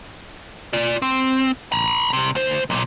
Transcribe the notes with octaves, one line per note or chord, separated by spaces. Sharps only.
F4 D5
C4
A#5 B5
C2 C3
D2 C5
B1 A#2